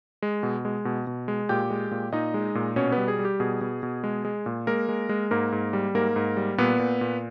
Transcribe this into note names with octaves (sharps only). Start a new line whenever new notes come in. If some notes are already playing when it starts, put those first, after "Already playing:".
G#3
B2
G#3
B2
B2
G#3
A#2 G4 G5
G#3
A#2
A#2 D#4 D#5
G#3
A#2
B2 C#4 C#5
B3 B4
G3
G#4
G3
G4
B2 G#4
B2
B2
G#3
G#3
A#2
G#3 A#3 A#4
G#3
G#3
G#2 A#3 A#4
G#2
G3
G#2 A#3 A#4
G#2
G3
A#2 B3 B4
A#2
A#2